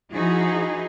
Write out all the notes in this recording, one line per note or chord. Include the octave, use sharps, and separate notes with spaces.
F3 D#4 E4 F#4 G#4